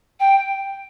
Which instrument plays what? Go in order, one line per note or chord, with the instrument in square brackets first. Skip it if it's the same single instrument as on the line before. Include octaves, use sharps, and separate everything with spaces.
[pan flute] G5